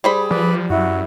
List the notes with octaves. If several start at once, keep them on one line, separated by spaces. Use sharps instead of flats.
G3 G#4 C5 B5
F3 B4 D5
F#2 E4 F#4